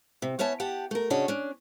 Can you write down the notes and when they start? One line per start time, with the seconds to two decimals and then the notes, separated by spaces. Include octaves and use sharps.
0.22 C3
0.39 B3 C#4 C#5 E5 A5
0.60 G4 F#5 A5
0.91 A3 A#4
1.10 C#3 C#4 D4 F#4 C#5 D#5
1.28 C#4 D4